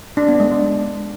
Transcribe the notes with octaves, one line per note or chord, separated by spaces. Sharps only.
D4
B3
G#3
D4